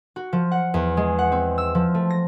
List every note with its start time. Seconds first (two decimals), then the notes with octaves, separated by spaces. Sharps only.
0.16 F#4
0.33 F3
0.51 F#5
0.74 E2
0.97 G#3
1.19 F#5
1.32 C4
1.58 E6
1.75 F3
1.94 A3
2.10 A#6